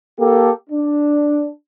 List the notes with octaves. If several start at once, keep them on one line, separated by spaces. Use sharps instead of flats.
A#3 G4 A4
D4